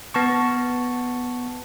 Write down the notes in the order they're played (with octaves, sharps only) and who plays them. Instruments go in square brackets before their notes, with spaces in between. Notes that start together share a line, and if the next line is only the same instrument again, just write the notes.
[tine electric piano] B3 A5 C#6